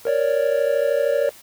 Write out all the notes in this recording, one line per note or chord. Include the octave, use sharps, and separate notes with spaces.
A#4 C#5 D5